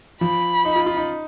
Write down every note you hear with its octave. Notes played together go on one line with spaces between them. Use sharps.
F3 B5
D#4
F4
F4
D#4